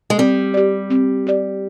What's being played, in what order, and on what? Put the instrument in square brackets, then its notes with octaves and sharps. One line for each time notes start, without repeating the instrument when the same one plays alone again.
[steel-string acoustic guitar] G#3
[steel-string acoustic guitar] G3 [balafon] C4
[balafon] G4 D5
C4
G4 D5